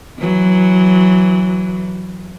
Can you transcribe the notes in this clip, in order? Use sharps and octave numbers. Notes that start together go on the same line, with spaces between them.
E3 F#3